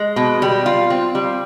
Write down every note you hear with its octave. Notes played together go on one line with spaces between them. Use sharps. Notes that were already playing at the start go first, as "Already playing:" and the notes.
Already playing: G#3
B2
G3
F4
C4
G3